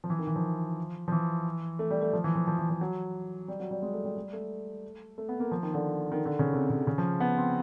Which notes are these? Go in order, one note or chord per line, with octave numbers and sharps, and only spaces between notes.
F3
E3
D#3
E3
F3
F3
E3
A3
G3
A3
F3
E3
F3
F3
E3
F3
F#3
G3
F#3
G3
G#3
A3
G3
G3
A3
A3
B3
A#3
F3
D#3
D3
D#3
D3
C#3
C3
C#3
C#3
F3
B3
C4